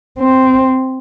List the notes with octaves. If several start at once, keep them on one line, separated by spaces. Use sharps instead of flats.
C4